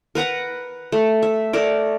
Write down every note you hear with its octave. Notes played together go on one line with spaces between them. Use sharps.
A#4 B4 F#5 A#5
A3
E5
A3 A#4 D5